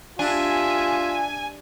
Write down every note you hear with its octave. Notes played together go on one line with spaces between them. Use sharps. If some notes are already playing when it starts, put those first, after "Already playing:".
D4 F4 G4 E5 G#5